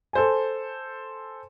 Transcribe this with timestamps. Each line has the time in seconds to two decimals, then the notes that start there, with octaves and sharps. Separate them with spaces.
0.13 A4 C5 G#5